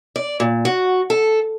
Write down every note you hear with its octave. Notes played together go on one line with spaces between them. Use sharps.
D5
A#2
F#4
A4